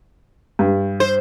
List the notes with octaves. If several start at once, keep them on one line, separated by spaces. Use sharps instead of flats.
G2
C5